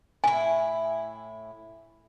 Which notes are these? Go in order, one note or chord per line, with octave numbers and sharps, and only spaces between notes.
A2 E4 G#5